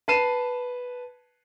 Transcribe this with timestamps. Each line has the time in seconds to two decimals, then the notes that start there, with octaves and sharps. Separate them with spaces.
0.08 B4 A5 C7 D#7 E7